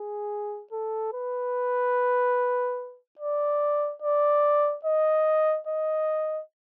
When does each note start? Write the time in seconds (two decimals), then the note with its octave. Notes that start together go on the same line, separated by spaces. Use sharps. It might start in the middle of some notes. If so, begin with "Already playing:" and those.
Already playing: G#4
0.72 A4
1.13 B4
3.19 D5
4.02 D5
4.85 D#5
5.67 D#5